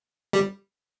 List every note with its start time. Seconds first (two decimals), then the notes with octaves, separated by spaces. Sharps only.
0.33 G3